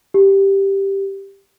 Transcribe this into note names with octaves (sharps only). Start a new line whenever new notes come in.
G4